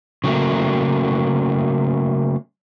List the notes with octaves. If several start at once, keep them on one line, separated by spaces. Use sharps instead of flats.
C#3 F#3 A3 A#3